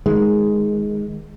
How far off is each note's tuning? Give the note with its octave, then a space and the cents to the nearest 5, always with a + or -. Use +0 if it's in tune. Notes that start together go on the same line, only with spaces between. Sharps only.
D#3 +10 G#3 +0